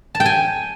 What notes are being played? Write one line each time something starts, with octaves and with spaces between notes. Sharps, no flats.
A5
G5
G#5